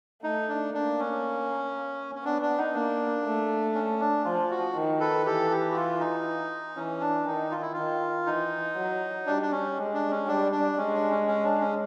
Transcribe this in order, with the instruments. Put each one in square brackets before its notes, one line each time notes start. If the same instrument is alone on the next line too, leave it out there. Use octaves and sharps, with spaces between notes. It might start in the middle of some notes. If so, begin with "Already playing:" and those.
[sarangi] A3 [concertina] D#4
[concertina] D4
[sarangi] A#3 [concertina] D4
[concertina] C#4
C#4
[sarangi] B3 [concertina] D4
[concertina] D4
D#4
[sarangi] A#3 [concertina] D4
[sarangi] A3
[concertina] C#4
D4
[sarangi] F3 [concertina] F4
[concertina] F#4
[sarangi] D#3
[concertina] A4 B4
[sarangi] E3 [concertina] G4 A4
[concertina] G4
F#4
F4
D#4
[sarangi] E3 [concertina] C#4
[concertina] D4
[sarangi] D#3 [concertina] D#4
[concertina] F4
E4
[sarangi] D#3 [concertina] F4
[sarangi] E3 [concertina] D#4
[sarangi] F#3
[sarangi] G3 [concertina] D4
[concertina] D4
C#4
[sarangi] G#3
[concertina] D4
C#4
[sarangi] G3 [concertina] D4
[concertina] D4
[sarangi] G#3 [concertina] C#4
[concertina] D4
C#4
C#4
D4
C#4